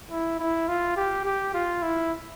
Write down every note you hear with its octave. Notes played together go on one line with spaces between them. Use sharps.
E4
E4
F4
G4
G4
F4
E4